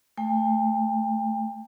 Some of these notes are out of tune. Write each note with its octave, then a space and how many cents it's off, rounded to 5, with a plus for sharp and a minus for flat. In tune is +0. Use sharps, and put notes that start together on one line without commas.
A3 +0 G5 +35